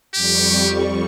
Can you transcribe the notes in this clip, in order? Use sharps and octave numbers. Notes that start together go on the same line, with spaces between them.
F2 G3 G4 C#6